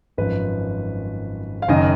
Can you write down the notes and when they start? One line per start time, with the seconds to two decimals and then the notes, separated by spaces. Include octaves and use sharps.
0.17 G#1 F#2 F3 B4
1.62 F5
1.68 F#1 F#2 D#3 D#5